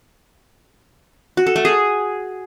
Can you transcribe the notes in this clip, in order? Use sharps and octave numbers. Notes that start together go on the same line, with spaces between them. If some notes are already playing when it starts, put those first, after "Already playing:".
F#4
A4
A3
G#4